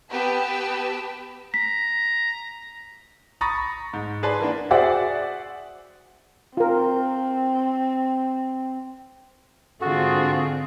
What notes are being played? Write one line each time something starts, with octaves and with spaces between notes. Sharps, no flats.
B3 G4 B4 A5 E6
A#5 B6
A#5 B5 C#6 D#6 A6 A#6
G#2
G#4 B4 D5 A5 C6
E3 A#3 B3 D4
F#4 G#4 C5 D5 E5 F#5
C4 F4 A#4
G#2 D3 C4 F4 F#4 G#4 A4